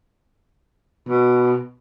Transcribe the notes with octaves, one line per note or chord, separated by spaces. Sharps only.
B2